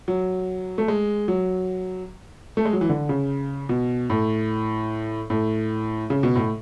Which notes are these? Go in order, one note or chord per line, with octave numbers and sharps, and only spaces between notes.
F#3
A3
G#3
F#3
A3
G#3
F#3
E3
D3
C#3
B2
A2
A2
C#3
B2
A2